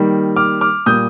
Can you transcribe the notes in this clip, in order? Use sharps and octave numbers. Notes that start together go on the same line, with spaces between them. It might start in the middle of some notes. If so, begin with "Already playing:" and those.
Already playing: D#3 G3 A#3
D6 F6
D6 F6
A#2 G3 A#3 D#6 G6